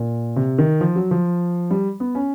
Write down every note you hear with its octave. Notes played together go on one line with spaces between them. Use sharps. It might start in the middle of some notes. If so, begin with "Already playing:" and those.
Already playing: A#2
C3
D#3
F3
F#3
F3
G3
B3
C#4